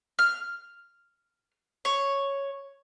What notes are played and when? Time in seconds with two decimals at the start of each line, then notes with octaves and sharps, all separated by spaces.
0.19 F6
1.85 C#5